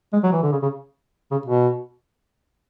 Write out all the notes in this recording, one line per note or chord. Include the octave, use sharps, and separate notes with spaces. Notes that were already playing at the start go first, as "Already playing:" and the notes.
G#3
F#3
E3
D3
C#3
C#3
C#3
B2